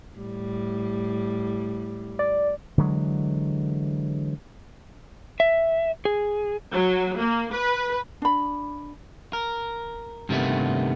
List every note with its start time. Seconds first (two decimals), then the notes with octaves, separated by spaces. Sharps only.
0.16 A2 G3
2.19 D5
2.78 D3 E3 F#3 G#3
5.40 E5
6.05 G#4
6.73 F#3
7.18 A#3
7.53 B4
8.22 D4 B5
9.33 A#4
10.29 G2 C3 D#3 A3 B3